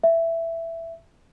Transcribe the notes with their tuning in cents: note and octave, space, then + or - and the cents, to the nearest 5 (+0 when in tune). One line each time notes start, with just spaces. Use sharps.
E5 +10